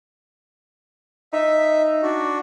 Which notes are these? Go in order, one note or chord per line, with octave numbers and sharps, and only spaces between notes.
D#4 E5
D4 F#4